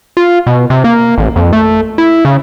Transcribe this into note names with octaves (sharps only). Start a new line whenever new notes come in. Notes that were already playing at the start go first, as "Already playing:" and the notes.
F4
B2
C3
A#3
A1
F2
A3
E4
C#3